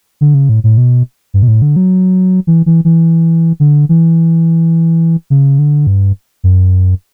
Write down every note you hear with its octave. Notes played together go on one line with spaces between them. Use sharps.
D3
C#3
A2
A2
B2
G2
B2
A2
D3
F#3
E3
E3
E3
D3
E3
C#3
D3
G2
F#2